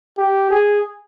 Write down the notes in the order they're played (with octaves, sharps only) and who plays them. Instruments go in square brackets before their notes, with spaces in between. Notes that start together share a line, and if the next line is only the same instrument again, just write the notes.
[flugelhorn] G4
G#4